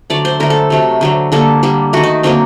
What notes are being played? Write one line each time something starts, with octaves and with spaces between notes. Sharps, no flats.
D3 F#3 A3 D5
C5
D3 A3 A#4
A4
C3 F#3 A3
D3 F#3 A3
D3 G3 A#3 A4
D3 G3 A#3
D#3 A3 F#4
D#4
D3 F#3 A#3 C4